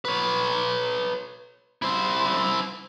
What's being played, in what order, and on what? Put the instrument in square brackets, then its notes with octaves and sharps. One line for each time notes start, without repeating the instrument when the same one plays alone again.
[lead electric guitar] B4 C#5
E4 C5